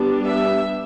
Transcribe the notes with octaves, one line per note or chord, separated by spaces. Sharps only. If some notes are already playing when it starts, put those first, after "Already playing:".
Already playing: G3 B3 D4
E5